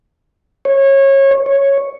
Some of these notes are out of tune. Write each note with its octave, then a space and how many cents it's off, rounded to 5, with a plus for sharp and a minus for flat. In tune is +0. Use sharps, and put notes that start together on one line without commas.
C#5 -25
C#5 -5